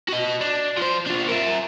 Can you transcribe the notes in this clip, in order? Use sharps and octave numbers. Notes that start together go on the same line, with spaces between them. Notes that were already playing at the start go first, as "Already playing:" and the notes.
F#4 D#5
D4
F3 C5
D4 F4
A#4 E5